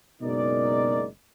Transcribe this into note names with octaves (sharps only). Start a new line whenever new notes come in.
F#1 B2 G#3 D#4 A#4 D5